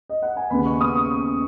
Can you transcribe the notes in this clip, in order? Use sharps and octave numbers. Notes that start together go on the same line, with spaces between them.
D#5
F#5
G#5
D#2 C#3 B3 B5
C#6
D#6
C#6